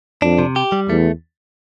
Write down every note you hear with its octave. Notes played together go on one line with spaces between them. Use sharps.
F2 D4
C3
G4
G3
E2 A3